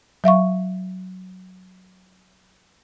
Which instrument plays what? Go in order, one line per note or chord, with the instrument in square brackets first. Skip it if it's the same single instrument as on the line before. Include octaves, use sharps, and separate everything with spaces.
[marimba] F#3 E5 F5 C#6